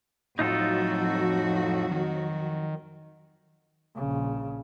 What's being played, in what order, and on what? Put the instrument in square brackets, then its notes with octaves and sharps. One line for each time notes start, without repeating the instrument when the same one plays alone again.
[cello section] F2 F#3 F#4 [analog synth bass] A2 [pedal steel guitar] D#4 F4 A4
[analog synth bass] D#3
[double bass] A#1 C#3